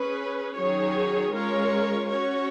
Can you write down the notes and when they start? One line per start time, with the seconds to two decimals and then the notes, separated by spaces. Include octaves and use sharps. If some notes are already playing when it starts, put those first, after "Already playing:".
Already playing: C#4 G#4 B4
0.55 D#3 F#3 C#4 G#4 C#5
1.31 G#3 C#4 F4 A#4 C#5
2.08 C#4 F#4 C#5